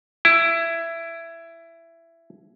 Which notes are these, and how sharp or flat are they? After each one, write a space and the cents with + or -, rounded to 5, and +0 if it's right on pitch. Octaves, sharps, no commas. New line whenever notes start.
E4 +15